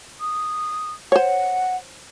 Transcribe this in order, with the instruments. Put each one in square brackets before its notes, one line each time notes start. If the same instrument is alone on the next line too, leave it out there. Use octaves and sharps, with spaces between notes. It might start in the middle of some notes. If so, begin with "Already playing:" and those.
[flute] D#6
[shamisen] C5 C#5 [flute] F#5